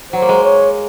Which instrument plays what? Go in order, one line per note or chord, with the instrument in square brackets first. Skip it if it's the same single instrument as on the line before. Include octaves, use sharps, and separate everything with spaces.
[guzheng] F#3 [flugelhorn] C5
[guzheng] A#3
G#3
[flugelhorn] C#5